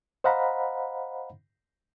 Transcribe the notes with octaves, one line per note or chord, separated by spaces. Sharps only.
C5 D#5 F5 F#5 A#5 B5